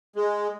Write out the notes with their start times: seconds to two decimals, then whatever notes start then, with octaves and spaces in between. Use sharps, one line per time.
0.16 G#3